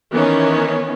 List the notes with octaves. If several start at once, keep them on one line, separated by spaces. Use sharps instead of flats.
D#3 E3 B3 C#4